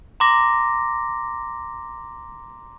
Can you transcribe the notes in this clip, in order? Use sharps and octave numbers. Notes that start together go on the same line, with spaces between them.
A#5 C6 D6 A#6